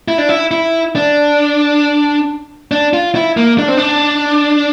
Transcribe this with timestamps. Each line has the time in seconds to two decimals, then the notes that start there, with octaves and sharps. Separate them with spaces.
0.08 E4
0.18 D4
0.29 E4
0.51 E4
0.96 D4
2.71 D4
2.93 F4
3.15 E4
3.37 A#3
3.58 D4
3.68 C4
3.77 D4